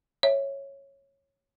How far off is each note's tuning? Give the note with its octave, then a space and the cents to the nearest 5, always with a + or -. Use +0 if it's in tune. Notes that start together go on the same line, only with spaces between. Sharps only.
C#5 -10 E5 +0